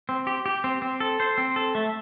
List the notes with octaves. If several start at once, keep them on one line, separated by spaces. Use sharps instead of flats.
C4
G4
G4
C4
C4
A4
C5
C4
A4
A3